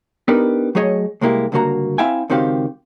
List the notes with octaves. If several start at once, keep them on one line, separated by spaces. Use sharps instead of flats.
B3 D4 D#4 G4 A#4 B4
F#3 A3 G#4 C#5 D#5
C2 G#3 A#3 E4 G4
C#2 G2 D3 A#3 F#4 A#5
C4 E4 E5 F5 G5 G#5
C#2 D#3 C4 F#4 G4 F5